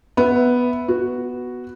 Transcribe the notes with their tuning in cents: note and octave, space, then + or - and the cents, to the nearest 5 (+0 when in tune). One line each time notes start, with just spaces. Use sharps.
B3 +0 E5 +0
B3 +0 F#4 +0